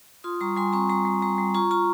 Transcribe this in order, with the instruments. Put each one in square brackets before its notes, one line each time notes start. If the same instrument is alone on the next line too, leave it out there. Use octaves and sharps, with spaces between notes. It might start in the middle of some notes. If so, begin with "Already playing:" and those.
[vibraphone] F4 C6 D#6
G3 A#5 C#6
G3 G#5 C6
C4 A#5 C#6
G3 A#5 C#6
G3
G3 A#5 C#6
G3
F4 A#5 C#6
F4 A#5 C#6